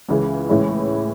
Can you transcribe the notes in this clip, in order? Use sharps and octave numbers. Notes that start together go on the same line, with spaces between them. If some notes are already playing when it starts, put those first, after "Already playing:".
C#2 C#3 E3 G#3
A2 E3 G#3 C#4 E4